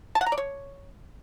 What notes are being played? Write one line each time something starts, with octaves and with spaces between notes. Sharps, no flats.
A5
F#5
A#5
D5
C#5